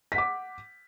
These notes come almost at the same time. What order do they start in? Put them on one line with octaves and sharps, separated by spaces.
B6 F#5 D6